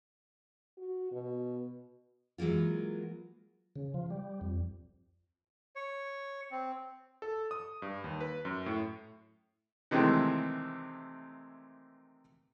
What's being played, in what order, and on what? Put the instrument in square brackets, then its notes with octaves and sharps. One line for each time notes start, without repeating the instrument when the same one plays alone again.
[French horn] F#4
B2
[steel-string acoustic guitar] E3 F#3 G#3 A#3 F4
[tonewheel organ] C#3
F3
G3
F2
[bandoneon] C#5
C4
[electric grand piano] A4
D#6
G2
D#2
B4
F#2
A2
[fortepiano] C3 D#3 E3 G#3 A3 C4